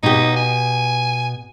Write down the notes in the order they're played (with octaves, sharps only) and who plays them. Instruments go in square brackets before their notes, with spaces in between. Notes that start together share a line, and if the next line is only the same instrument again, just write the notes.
[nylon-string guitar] B2 G4 [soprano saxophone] D#4
[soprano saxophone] G#5